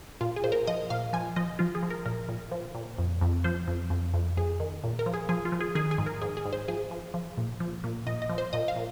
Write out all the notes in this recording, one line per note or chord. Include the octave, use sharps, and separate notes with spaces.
A#2 F4
G#4
A#2 C5
A#4
F3 D#5
A#2 F5
F3 G#5
F3 D#5
F3 F4
G#4
F3
A#4
A#2 A#4
A#2
F3
A#2
F2
F2
F3 C5
F2
F2
F2
F2 G#4
D#3
A#2
A#4
F3
G#4
F3 G#4
F4
F3
G#4
D#3 G#4
G#4
G#2
A#4
G#2 G#4
G#4
G#2
C5
F3 G#4
F3
F3
A#2
F3
A#2
A#2 D#5
D#5
F3
C5
A#2 D#5
F5
A#2